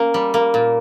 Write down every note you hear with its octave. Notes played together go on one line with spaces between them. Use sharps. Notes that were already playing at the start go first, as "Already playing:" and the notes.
Already playing: A#3 C#4
G3
A#3
A#2